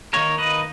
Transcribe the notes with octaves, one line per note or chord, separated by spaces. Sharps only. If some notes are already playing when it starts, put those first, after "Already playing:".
D#3 A#3 D#4 A#4 C#5
B4 D#5